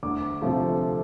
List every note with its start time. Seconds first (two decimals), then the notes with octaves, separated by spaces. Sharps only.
0.03 D2 D6
0.42 C3 F3 A3 F4